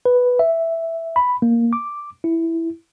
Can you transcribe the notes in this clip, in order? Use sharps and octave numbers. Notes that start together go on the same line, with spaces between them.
B4
E5
B5
A#3
D6
E4